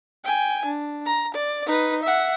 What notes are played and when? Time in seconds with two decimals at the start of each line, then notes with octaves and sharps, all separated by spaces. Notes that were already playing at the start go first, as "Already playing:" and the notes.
0.24 G5 G#5
0.65 D4
1.06 A#5
1.35 D5
1.66 D#4 B4
2.03 E5 F#5